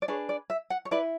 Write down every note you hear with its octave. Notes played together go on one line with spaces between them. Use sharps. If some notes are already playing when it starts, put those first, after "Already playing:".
D5
D4 G#4 B4 C#5
D5
E5
F#5
C#5
E4 B4 D5